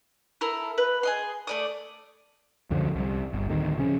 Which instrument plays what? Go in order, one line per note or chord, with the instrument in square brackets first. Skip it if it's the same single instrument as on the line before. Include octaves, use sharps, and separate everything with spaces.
[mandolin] E4 A4 A#4
B4
G#4 D#5 C6
A3 D5 D#6
[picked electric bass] C#2 F#2 D3 F3
C2
G1
D1 D2 D#3
C#3 F3 C#4